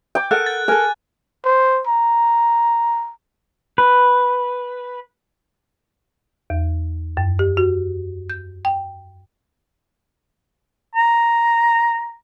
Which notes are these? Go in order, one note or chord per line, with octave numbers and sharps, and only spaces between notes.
G5 D6
A4 A#4 F#5 F#6
A6
A4 A#4 G#5
C5
A#5
B4
E2
F#2
G4
F#4
G6
G5
A#5